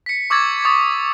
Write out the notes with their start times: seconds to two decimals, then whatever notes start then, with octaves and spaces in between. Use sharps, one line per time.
0.06 B6 C#7
0.30 C#6 D6 E6 G#6 A6
0.65 C#6 D#6 G#6 A6 C#7